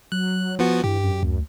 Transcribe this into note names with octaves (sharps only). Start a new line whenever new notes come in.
F#3 F#6
F3 B3 F#4
G2 E3 G4
F#2
D2